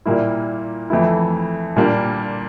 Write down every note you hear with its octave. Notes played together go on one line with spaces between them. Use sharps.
A#2 G3 A#3 E4
F2 E3 A3 E4
A#2 G3 A#3 D4